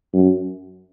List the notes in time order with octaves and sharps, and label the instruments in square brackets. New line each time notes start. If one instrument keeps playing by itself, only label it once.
[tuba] F#2